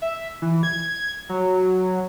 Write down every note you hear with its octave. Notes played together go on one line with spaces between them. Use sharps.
E5
E3
G#6
F#3